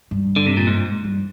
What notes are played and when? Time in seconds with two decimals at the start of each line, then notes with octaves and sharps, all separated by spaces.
0.11 G2
0.36 D3
0.47 C3
0.57 A#2
0.67 G#2
1.04 G2